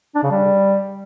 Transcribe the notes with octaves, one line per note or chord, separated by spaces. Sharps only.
D4
C#3
G3